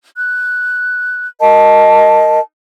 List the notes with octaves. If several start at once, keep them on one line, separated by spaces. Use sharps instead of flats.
F#6
A#4 D#5 A5